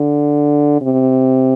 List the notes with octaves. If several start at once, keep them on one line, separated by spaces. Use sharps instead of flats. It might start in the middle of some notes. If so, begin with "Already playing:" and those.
Already playing: D3
C3